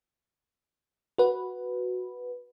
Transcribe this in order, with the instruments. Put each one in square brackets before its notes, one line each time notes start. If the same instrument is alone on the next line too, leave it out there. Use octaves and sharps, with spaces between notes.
[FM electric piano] F#4 B4